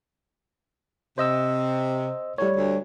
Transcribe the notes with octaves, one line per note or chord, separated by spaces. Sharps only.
C3 C5 D#5 E6
A2 G3 C#5
D2